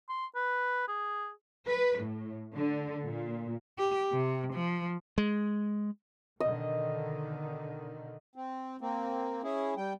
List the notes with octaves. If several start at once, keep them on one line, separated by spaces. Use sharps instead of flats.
C6
B4
G#4
B4
A2
D3
A#2
G4
C3
F3
G#3
B2 D3 D#3 D#5
C4
A#3 C4
C#4 E4 G#4
G3 G5